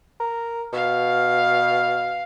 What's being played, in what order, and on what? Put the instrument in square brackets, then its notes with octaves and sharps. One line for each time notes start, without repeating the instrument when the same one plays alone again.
[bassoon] A#4
[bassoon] B2 [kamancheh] F5